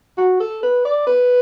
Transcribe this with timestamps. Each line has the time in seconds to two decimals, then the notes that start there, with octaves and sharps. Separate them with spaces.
0.17 F#4
0.40 A4
0.63 B4
0.85 D5
1.07 B4